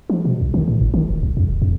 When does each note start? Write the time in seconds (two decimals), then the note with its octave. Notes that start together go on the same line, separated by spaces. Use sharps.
0.10 F3
0.25 B2
0.41 C2
0.54 D#3
0.68 A2
0.81 G1
0.94 D#3
1.10 D#1
1.23 C2
1.37 F2
1.49 D#1
1.62 F2